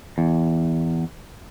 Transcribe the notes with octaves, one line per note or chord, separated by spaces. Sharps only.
E2